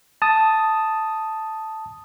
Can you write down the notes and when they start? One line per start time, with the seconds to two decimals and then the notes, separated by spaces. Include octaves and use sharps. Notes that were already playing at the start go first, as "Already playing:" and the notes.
0.22 A5 D#6